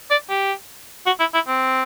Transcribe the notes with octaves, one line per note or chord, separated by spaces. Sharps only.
D5
G4
F#4
E4
E4
C4